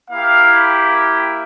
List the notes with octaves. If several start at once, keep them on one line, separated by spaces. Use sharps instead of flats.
A#3 E4 G4 F5